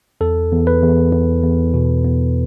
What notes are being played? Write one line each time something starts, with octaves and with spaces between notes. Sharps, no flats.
E2 A4
E2
B4
E2
E2
E2
B2
E2